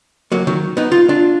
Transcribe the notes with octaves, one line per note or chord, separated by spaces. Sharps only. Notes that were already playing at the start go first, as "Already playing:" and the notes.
F#3 A#3
D#3 F#3
B3 D#4
F4
D4 F4